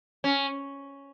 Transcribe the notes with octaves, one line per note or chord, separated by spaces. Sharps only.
C#4